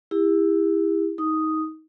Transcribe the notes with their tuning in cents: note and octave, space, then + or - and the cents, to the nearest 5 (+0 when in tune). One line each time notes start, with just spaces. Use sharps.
E4 +0 G4 +40
D#4 +20 D#6 +0